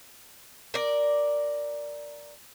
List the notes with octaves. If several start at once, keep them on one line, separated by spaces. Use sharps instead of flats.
A#4 D5